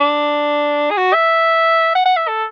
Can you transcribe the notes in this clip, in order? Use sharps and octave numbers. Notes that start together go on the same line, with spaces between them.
D4
G#4
F#4
E5
F#5
F#5
E5
A4